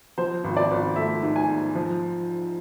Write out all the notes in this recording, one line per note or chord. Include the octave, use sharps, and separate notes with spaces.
F3 C5
G#1
D5
G#1
A3 E5
G#2
G#5
G#2
F3